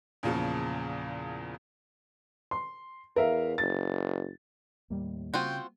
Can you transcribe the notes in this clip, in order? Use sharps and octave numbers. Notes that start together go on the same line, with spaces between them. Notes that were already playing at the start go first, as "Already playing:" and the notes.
E2 A#2 C#3 F3
C6
E2 A#4 E5 F5
F#1 A6
D#2 A2 G3 A#3
C#3 C4 F4 F#4 G5